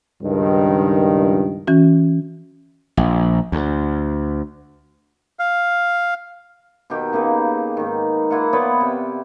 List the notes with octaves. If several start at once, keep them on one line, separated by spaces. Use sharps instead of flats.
C#2 G2 D#3
E3 C#4 F#4
A#1
D2
F5
B2 D#3 G4
C#3 A#3 D#4 B4
G#2 D#3
A#3 E4 F4 F#5
B3 B4 C#5 D5
C3 G5